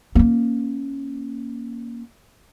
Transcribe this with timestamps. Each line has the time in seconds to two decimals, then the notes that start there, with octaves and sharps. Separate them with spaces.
0.15 A#3 C#4